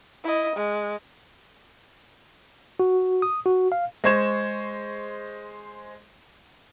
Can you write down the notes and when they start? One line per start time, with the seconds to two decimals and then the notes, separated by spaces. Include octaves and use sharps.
0.24 E4 D#5
0.56 G#3
2.80 F#4
3.22 D#6
3.46 F#4
3.72 F5
4.04 G#3 C5 C#6 G#6 E7